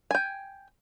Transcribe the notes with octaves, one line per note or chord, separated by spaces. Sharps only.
G5 G#5